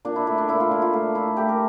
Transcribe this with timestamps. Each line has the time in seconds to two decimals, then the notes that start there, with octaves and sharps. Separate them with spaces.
0.05 A#2 D4
0.16 E4
0.27 A3 E4
0.38 D4
0.48 A#2 E4
0.60 F4
0.71 A#2 E4
0.82 F4
0.93 A3 F4
1.15 A3 E4
1.37 A3 G4
1.49 A#4